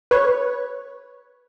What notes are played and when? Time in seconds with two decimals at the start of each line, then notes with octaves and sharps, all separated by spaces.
0.11 B4 C#5